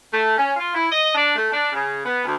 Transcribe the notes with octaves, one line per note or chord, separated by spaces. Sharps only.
A3
C#4
F4
E4
D#5
D4
A3
D4
C#3
B3
D2